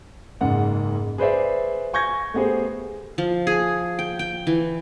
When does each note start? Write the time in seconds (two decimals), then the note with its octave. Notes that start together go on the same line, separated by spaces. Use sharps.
0.41 F#1 G#2 G#3 F#5
1.18 G#4 B4 C5 D5 E5
1.93 G#5 C#6 G6 G#6 A#6
2.34 A3 B3 G4 G#4 C5
3.18 F3
3.47 G#4
3.99 G5
4.19 G5
4.47 E3